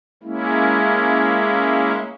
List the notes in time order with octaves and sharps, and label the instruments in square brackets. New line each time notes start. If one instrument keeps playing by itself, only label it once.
[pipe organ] G#3 A#3 C#4 E4